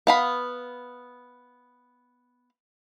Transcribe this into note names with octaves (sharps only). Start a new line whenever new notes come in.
B3 F5 B5